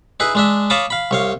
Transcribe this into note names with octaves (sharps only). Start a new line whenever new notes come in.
D#4 E4 G#4 B4
G#3 D4 E5
C#5 F5 A5 B5 D6 D#6
F5 B5
C2 C#5 F5